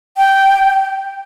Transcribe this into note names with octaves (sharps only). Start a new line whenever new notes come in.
G5